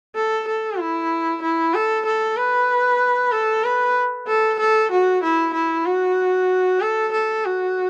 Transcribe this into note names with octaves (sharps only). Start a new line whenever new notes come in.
A4
A4
E4
E4
A4
A4
B4
A4
B4
A4
A4
F#4
E4
E4
F#4
A4
A4
F#4